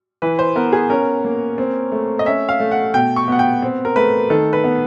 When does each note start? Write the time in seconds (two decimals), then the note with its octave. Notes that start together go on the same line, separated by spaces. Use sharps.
0.22 E3 B4
0.39 C5
0.56 B3 A#4
0.73 G#4
0.90 C#4 A#4
1.24 A#3
1.58 C4
1.92 A3
2.19 D#5
2.26 C#4 E5
2.49 F5
2.60 A3
2.71 F#5
2.94 B2 G5
3.16 C#6
3.28 B3 F#5
3.39 G5
3.62 C4
3.85 A#4
3.96 A3 B4
4.30 D#3 A4
4.53 B4
4.64 B3